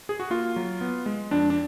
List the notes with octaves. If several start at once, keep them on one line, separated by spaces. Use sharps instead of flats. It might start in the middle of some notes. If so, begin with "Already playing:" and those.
G#4
F#4
A#3 F4
F#3
B3
G#3
F2 D4
D4